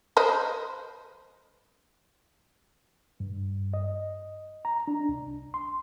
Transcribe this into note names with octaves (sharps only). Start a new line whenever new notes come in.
B4 C5 D#5
G2
D#5
A#5
D4
C2
C6